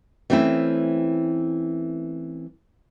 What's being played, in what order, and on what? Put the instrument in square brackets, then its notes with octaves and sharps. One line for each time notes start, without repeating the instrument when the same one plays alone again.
[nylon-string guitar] E3 A3 C4 C#4 E4